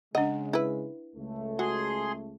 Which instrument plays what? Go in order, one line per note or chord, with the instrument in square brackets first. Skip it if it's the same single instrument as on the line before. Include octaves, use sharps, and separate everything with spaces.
[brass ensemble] C#3 G#3 [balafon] D4 F#5 [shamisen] D#5
[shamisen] E4 B4
[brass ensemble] C#2 A3
[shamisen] F#4 [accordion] G#4 C6